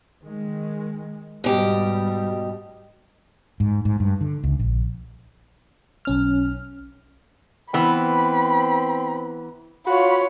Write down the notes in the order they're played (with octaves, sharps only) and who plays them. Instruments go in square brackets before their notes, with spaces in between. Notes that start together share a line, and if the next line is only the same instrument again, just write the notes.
[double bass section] D#3 G#3
[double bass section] G#2 G3 [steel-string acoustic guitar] B2 G4 D#5
[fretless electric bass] G#2
G#2
G2
D3
C#2
A#1
[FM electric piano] B1 C#4 F6
[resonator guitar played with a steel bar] E3 B3 [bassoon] C4 [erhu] B5
[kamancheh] F4 C#5 [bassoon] F#4 [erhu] B5